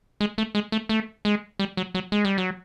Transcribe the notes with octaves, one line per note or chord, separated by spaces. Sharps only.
G#3
A3
G#3
A3
A3
G#3
G3
F#3
F#3
G#3
G3
F#3